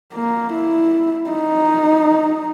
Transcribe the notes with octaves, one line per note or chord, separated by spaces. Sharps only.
A#3
E4
D#4